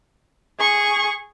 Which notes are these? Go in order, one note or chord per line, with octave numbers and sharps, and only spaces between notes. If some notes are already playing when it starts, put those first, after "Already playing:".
G#4 C#6